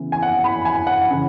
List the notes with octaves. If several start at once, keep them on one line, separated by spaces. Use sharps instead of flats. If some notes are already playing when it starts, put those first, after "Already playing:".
Already playing: C#3 E3 B3
G#5
F#5
B5
G#5
F#5
C#3 E3